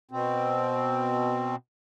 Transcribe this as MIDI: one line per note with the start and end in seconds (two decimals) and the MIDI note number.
0.11 1.56 47
0.11 1.56 60